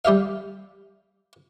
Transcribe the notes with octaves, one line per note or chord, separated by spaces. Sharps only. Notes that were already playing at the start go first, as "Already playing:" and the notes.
G3 G4 E5 F5